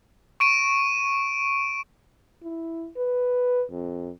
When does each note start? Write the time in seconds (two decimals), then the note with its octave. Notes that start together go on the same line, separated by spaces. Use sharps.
0.40 C#6 D7 D#7
2.43 E4
2.97 B4
3.71 F2